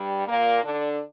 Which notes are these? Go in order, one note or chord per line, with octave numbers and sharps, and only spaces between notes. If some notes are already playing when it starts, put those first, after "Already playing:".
Already playing: G2 G3
A#2 A#3
D3 D4